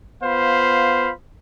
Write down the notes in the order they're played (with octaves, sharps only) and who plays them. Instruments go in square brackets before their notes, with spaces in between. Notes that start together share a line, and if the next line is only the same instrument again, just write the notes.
[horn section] B3 F4 C5 F5 B5